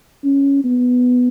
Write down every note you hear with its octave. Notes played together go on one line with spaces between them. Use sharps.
C#4
B3